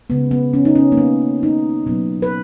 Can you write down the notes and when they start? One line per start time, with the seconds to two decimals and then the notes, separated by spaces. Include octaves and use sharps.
0.10 C#3 G#3 B3
0.31 B3
0.54 C#4
0.65 D#4
0.75 C#4
0.92 A#3
0.97 B3
1.43 D#4
1.86 B2 F#3 A#3 B3
2.22 B4